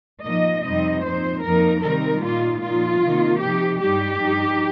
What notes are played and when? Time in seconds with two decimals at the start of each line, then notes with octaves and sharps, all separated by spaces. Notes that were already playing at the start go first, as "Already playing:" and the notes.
0.25 A#2 F3 A#3 D#4 D#5
0.65 F2 C3 G3 C4 D#4 D#5
1.04 A#2 F3 C4 D#4 C5
1.44 F2 F3 A#3 D#4 A#4
1.83 C3 D#3 G3 C4 D#4 A#4
2.23 A#2 A#3 D#4 F4
2.63 A#2 F3 D#4 F4
3.02 C3 D#3 A#3 D#4
3.41 C3 F3 D#4 G4
3.81 G2 G3 D#4 G4
4.21 G2 F3 D#4